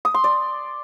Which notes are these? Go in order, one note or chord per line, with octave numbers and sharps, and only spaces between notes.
D#6
C6
D5